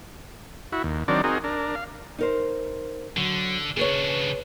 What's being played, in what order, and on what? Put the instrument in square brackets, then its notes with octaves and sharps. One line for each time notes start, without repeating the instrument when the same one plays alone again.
[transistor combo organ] E4 F#4
D#2
D#3 F#3 C4 D4 A#4 D5
C4 D#4 F#4 G#4 A#4
D4 A#4
F5
[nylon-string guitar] D#4 A#4 C5
[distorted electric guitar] D3 [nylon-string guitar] F#3
[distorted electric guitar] C#3 D4 [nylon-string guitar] G#4 B4 C#5